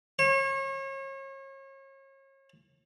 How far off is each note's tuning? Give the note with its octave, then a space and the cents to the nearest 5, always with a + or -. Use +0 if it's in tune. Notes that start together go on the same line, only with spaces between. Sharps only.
C#5 -35